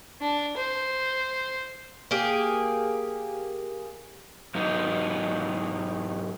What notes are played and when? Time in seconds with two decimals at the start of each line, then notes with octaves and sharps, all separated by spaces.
0.21 D4
0.57 C5
2.11 A#3 G4 G#4
4.55 G#2 F#3 B3 D#4